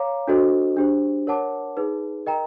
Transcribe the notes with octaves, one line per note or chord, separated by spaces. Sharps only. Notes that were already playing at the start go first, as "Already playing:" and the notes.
Already playing: C#5 F5 A#5 D6
D4 F#4 A4 C5 D#5
D4 G4 C5
A#4 C#5 F#5 A5 D6
D#4 G#4 B4
A#4 D#5 G5 A#5